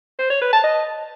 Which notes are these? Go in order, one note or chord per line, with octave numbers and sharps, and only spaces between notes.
C5
C#5
B4
A5
D#5